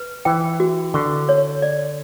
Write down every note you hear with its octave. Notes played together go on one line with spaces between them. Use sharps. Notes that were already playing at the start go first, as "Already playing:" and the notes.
Already playing: B4
E3 G5
F#4
D3 C#6
C#5
D5